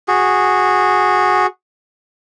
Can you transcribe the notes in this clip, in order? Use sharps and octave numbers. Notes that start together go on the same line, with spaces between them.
F#4 G#4